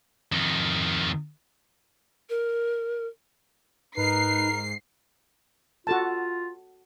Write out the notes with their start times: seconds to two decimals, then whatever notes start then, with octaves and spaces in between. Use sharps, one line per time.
0.32 F2 D#3
2.30 A#4
3.97 G#2 D#4 A#4 B4 C7
5.87 F4 F#4 A4 A5